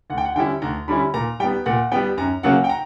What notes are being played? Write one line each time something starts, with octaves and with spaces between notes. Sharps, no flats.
D2 F#5
G5
F#5
D3 G3 C#4 E4 G5
D2 A#5
D3 G3 C#4 E4 B5
A#2 A#5
G3 B3 G5
A#2 F#5
G3 B3 G5
F#2 A#5
C#3 F#3 A#3 F#5
G5
A#5